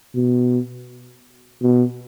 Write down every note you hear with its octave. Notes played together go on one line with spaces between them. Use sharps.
B2
B2